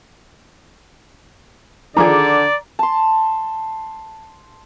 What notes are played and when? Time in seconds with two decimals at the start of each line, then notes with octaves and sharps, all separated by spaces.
1.97 D3 D#3 F3 G#4 D5 A#5 D6
2.79 A5 C6